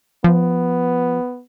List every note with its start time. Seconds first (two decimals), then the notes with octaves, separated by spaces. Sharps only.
0.24 F3 B3